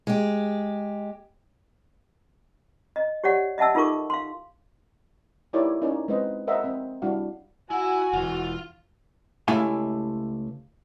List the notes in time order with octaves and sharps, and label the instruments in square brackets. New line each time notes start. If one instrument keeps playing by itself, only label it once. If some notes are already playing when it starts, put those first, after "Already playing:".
[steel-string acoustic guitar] G#3 G4
[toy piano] D#5
G4 C#5 D5 F#5
D#5 E5 F#5 A5 E6
D#4 F4 A4 A#4 C#6 D6
F5 C6
[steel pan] D#4 E4 G4 A#4 C#5 D5
C#4 D#4 F4 A#4 D5
G#3 C4 B4 C5 D#5
G#4 A#4 C5 D#5 E5 F#5
C4
G3 D4 E4 F#4 F5
[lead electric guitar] E4 [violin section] F#4 [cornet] G#5
[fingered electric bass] E1 E3 [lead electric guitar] F4 F5
[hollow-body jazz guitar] C#2 A3 E4 G4 F5 G#5